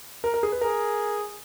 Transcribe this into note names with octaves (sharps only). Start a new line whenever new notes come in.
A#4
A#4
G#4
B4
G#4 A#4